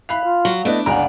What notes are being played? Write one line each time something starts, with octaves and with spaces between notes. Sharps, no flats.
E5 F5 B5 F#6 C7
F4
F#3
A3 B3 D4 E4 D#5
G1 C#2 D5 F5 F#5 G#5 A#5